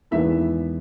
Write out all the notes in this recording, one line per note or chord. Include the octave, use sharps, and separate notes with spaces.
E2 D#3 G#3 B3 E4 E5